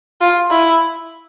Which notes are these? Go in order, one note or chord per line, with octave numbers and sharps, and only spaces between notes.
F4
E4